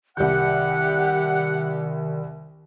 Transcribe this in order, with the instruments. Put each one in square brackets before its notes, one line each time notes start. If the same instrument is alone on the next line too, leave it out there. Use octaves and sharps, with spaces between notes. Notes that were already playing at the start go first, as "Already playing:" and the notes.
[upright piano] C2 G6 [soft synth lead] D#3 [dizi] G4 [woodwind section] F#5